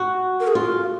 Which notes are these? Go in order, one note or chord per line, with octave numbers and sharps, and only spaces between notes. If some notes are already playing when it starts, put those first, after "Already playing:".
Already playing: F#4
A#4
G#4
F4 F#4